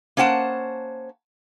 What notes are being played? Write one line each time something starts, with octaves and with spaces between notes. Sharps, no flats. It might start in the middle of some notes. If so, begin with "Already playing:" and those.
A#3 C#4 C5 F#5 A5